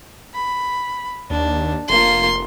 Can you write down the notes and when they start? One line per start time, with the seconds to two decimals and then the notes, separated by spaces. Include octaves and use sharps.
0.34 B5
1.30 D#2 D4
1.89 F1 A#3 F4 C6